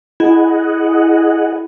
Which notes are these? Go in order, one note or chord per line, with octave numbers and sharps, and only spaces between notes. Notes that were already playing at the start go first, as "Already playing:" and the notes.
E4 G#4 D#5 F#5